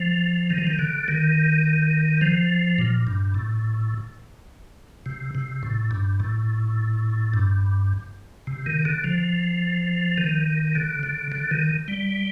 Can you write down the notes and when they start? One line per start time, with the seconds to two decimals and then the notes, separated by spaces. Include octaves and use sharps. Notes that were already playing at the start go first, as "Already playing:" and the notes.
Already playing: F3
0.50 D#3
0.58 F3
0.67 D#3
0.79 D3
1.08 D#3
2.21 F3
2.78 A#2
3.07 G2
3.34 A2
5.06 C3
5.35 C3
5.63 A2
5.91 G2
6.20 A2
7.34 G2
8.47 C3
8.66 D#3
8.85 D3
9.04 F3
10.18 D#3
10.75 D3
11.03 D3
11.32 D3
11.51 D#3
11.88 G3